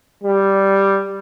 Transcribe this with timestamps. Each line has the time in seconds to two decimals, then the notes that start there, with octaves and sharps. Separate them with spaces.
0.24 G3